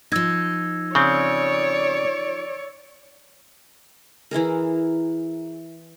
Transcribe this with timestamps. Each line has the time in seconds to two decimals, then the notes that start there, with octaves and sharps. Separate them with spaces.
0.12 F3 D#4 E6 G#6 A#6
0.95 C#3 C4 C#5 D5
4.31 E3 E4 G#4 A#4